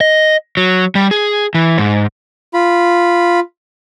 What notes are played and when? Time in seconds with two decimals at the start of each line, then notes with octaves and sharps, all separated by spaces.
0.01 D#5
0.57 F#3
0.95 G3
1.11 G#4
1.54 E3
1.78 G#2
2.54 F4 B5